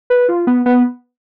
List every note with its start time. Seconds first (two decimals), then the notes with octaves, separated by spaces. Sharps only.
0.10 B4
0.28 F4
0.47 B3
0.66 B3